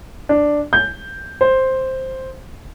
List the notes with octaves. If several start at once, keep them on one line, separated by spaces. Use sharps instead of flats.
D4
G6
C5